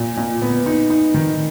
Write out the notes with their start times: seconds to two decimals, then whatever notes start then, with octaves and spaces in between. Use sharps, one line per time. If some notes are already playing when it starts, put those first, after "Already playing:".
Already playing: A#2
0.17 A#2
0.42 B3
0.66 D#4
0.90 D#4
1.14 D#3